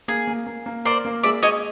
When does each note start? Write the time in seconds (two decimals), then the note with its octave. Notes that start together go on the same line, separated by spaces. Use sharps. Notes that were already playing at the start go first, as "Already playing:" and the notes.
0.08 A#3 G#4
0.27 A#3
0.47 A#3
0.66 A#3
0.85 A#4 C5 D5
1.05 A#3
1.23 G#3 D5 E5
1.43 G#3 C#5 D#5